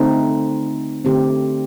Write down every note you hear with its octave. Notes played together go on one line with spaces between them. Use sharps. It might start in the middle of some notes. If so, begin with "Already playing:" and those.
Already playing: D3 A3 C4 D#4
D3 A3 C4 G4